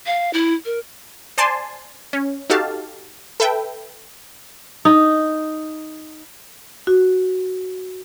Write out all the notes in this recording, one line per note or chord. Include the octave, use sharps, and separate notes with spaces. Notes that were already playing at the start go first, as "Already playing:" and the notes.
F5
E4
A#4
C5 D5 G#5 A5 C6
C#4
D#4 F#4 G4 A4 F5 A5
A4 B4 E5 G5
D#4
F#4